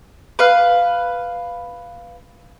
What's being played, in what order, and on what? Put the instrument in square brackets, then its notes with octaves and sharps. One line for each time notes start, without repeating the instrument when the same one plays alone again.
[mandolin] B4 F5